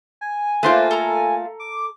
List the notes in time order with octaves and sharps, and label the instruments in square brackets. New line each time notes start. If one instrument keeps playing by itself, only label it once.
[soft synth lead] G#5
[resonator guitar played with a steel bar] A3 A#3 F4 [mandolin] B4 C5 D6
[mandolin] A4 A#5
[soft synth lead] D6